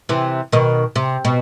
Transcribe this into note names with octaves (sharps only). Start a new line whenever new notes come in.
C3 E3
B2 D#3
C3
B2